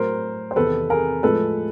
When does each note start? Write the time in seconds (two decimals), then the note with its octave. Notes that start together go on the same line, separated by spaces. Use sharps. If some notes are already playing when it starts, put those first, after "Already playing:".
Already playing: A2 F#3 A#4 C5
0.51 C5
0.56 E2 C3 D#3 A4 B4
0.90 G#4 A#4
1.23 A2 F3 G#3 A4 B4